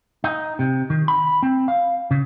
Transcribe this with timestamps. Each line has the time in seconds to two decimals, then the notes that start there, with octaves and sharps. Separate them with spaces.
0.24 D#4
0.59 C3
0.90 D#3
1.08 B5
1.43 C4
1.68 F5
2.11 C#3